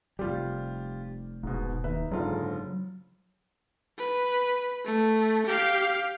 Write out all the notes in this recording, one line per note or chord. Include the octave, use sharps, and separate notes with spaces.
F1 C3 G3 F4 G4
E1 G#2 B2
D#2 D#4 B4 E5
F#1 G#2 D3 F#3 F4
B4
A3
G4 F5